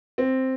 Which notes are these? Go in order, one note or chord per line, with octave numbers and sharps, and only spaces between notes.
C4